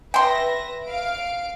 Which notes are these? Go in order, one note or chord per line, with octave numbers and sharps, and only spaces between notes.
B4 E5 G5 C6 A#6
F5 D7